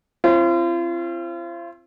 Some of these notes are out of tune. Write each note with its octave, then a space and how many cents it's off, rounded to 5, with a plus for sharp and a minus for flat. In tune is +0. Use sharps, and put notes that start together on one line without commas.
C4 +25 F4 -40